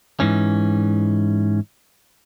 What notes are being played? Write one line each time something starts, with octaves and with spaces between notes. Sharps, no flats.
G#2 E3 C#4